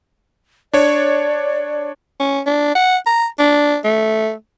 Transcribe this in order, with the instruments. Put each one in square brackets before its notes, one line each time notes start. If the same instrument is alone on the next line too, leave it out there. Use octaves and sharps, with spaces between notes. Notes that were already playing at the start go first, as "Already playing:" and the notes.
[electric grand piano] D4 C#5 [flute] D5
[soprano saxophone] C#4
D4
F#5
A#5
D4
A3